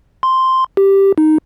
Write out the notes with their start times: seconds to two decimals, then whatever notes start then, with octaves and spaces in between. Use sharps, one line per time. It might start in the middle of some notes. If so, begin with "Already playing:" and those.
0.23 C6
0.77 G4
1.18 D#4